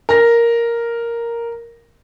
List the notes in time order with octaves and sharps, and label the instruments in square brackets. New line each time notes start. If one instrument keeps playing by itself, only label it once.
[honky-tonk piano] A#4 A#6